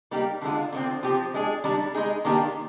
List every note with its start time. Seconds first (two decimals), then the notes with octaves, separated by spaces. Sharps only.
0.11 G3 A#3 D#4 G4
0.42 D3 G#3 D4 F4
0.73 D3 F3 C4
1.03 F3 C4 G4
1.34 G#3 D4 G#4
1.64 D#3 G3 D4
1.94 G#3 D#4 G#4
2.25 D#3 A#3 D4 G4